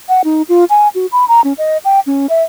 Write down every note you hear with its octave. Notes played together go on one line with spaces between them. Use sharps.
F#5
D#4
F4
G#5
F#4
B5
A#5
C#4
D#5
G5
C#4
E5